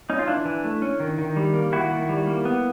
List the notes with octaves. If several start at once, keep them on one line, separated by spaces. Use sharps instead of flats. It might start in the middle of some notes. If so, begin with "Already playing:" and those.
C#4 D#4
F4
E3 D4 E4
E3
A3
C#4
D#3
D#3
G3
A#3
D#3 E4 F#4
D#3
G3
A#3
B3